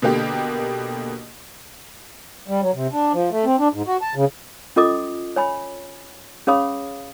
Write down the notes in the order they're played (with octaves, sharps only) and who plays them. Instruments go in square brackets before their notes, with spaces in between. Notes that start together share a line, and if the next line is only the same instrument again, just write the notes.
[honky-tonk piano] B2 D3 A#3 G4
[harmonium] G3
F#3
C3
D4
F3
A3
C4
D4
G#2
F#4
A5
C#3
[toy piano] C#4 F4 A4 D#5 D6 D#6
C#5 G#5 B5
C#4 G#4 C#5 F5 B5 D#6